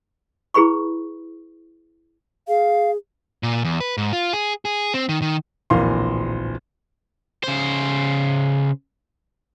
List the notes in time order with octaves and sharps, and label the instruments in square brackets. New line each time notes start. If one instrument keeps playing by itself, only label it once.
[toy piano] E4 G#4 B4 B5 C#6
[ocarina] G#4 [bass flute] F5
[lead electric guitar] A#2
E2
B4
G#2
F4
G#4
G#4
C4
D#3
D#3
[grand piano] D1 A#1 E3 A#4 F5 C6
[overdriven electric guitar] C#3 C5